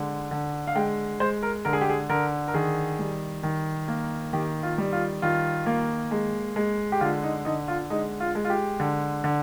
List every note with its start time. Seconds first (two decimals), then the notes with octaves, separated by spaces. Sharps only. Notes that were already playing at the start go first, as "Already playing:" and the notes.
Already playing: D3 G#3
0.31 D3
0.67 F5
0.75 G#3 G5
1.20 G#3 C5
1.43 A#4
1.65 D3 A#4
1.73 G#4
1.81 G4
1.90 G#4
2.09 D3 A#4
2.48 A#4
2.54 D#3 G#4
2.99 G3
3.43 D#3
3.88 A#3
4.33 D#3 G4
4.63 F4
4.78 G3
4.93 F4
5.22 D#3 F4
5.66 A#3
6.11 G#3
6.56 G#3
6.92 G4
7.01 D3 F4
7.23 D#4
7.45 D3 D#4
7.68 F4
7.90 G#3 D#4
8.20 F4
8.35 G#3
8.45 F4
8.50 G4
8.80 D3
9.24 D3